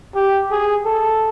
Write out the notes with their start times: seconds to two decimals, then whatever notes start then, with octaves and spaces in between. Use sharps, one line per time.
0.15 G4
0.51 G#4
0.86 A4